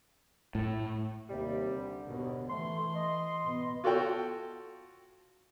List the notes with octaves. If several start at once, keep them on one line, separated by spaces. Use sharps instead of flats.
A2
D#2 C3 G3
D3
D#2 B2
E3 A3 C6
D#5
B2 B3
F4 F#4 A4 C#5 G5